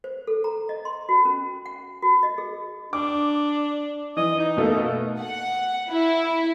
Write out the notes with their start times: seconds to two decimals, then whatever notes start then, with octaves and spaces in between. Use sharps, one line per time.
0.04 C5
0.27 A4
0.44 A#5
0.69 D#5
0.85 C6
1.09 F#4
1.25 C#4
1.66 F#5
2.02 F#4
2.23 D#5
2.38 G#4
2.93 D4 D6
4.17 E3 D#5
4.40 D#4
4.57 B2 A3 A#3
5.22 F#5
5.91 E4